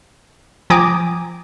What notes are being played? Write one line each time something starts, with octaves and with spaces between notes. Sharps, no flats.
F3 G5 G#5 A#5 D6 D#6